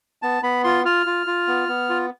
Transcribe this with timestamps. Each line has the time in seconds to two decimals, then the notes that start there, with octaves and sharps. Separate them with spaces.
0.22 B3 A5
0.43 B3 B5
0.64 F4 C6
0.85 F4 F6
1.06 F4
1.27 F4
1.48 B3
1.69 B3
1.89 F4